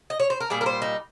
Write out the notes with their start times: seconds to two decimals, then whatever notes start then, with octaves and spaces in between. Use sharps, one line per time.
0.10 D#5
0.20 C#5
0.30 C5
0.40 A#4
0.50 A#2 G3 G#4
0.61 A#4
0.66 C5
0.82 D#4